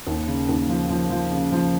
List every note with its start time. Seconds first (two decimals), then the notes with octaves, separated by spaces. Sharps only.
0.07 D#2
0.27 C#3
0.49 D#2
0.69 F3
0.90 F3
1.10 F3
1.32 C#3
1.52 F3